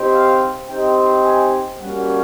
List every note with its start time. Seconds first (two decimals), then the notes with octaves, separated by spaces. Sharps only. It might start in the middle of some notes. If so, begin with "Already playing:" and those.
Already playing: C4 D#4 G4
0.13 F5
0.69 C4 D#4 G4 G5
1.24 G#5
1.80 G3 A#3 C#4 F#4 F#5